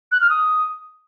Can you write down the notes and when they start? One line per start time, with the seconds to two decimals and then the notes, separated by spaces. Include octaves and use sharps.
0.12 F#6
0.21 F6
0.30 D#6